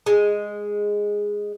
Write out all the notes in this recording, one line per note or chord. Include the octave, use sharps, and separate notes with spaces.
G#3